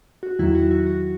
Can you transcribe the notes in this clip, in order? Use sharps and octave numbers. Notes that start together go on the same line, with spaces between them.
F#4
E2 D#3 F#3 E4
F#4
F#4
F#4